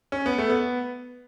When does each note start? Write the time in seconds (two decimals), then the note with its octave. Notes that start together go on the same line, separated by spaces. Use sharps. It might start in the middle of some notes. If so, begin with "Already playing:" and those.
0.12 C#4
0.26 B3
0.38 A3
0.50 B3